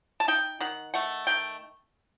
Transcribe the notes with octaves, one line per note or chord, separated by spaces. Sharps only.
A5
D#4 G5
D#3 F#5
A3 F#5
D#3 G5